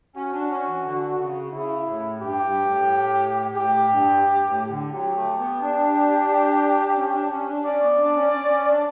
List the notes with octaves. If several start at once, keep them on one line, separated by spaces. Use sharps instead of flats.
C#4 F#4
D4
C#4
E3
D3
C#3
C#3 E4
A2
G2 G4
G2
A2
A2 G4
G2
A2
D3
F#3 G4
A3
B3
D4
C#4
D4
C#4
D4
C#4 D5
B3
D4
C#4
C#4
C#4
D4